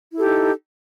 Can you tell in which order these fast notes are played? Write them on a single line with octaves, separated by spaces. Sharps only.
E4 A4 G4 D#4